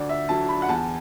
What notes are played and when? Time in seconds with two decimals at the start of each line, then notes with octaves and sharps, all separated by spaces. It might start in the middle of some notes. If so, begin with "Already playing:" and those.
Already playing: D2 D5
0.09 E5
0.29 D3 F#3 A5
0.49 B5
0.62 F#5
0.69 E2 A5